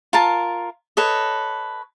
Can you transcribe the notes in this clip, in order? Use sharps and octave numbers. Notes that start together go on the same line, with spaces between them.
F4 A#4 A5
A4 B4 C#5 D#5